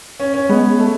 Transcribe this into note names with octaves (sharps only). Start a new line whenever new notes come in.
C#4
C#4
G#3 B3
A3